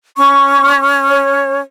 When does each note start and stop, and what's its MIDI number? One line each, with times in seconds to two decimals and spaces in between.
0.17 1.61 61
0.17 0.77 85
1.09 1.58 73